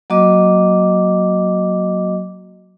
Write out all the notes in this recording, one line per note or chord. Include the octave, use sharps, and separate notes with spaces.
F#3 A#3 F#4 D#5 D6